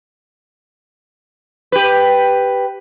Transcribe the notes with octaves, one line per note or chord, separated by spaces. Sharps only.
G4 B4